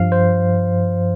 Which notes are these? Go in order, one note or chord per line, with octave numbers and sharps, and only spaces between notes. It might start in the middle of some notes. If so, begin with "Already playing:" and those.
Already playing: G2 F3 F5
C5